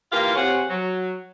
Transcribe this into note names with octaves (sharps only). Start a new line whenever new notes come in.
E3 A#3 F4 G4 A#4 F5
C3 G#4 C5 C#5 F#5
F#3